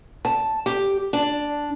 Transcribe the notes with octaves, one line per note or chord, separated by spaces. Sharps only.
A5
G4
D4